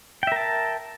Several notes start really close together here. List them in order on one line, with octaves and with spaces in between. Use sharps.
G5 E5 A#4 A5